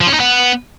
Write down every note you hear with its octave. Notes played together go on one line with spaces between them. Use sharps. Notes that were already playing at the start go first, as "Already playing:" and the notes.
F3
C#4
D#4
B3